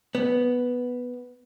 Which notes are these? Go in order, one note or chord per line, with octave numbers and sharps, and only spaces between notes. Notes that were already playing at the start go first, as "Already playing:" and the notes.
B3